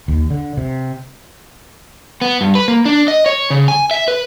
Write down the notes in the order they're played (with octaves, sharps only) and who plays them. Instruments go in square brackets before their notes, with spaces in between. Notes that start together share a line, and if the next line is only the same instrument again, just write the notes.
[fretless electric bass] D#2
D3
C3
[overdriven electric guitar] B3
G2
B4
A#3
D4
D#5
C#5
C#3
G#5
E5
B4